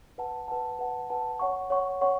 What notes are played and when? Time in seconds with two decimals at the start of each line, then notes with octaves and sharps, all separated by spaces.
0.18 B4 F#5 A5
0.48 B4 F#5 A5
0.79 B4 F#5 A5
1.10 B4 F#5 A5
1.39 C#5 F#5 C#6
1.70 C#5 F#5 C#6
2.01 C#5 F#5 C#6